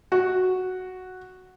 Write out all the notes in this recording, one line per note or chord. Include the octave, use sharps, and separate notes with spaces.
F#4